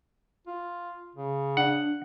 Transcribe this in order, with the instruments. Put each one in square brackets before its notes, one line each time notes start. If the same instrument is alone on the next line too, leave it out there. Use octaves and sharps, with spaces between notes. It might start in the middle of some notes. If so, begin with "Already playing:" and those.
[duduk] F4
C#3
[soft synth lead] D4 [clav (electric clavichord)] F#5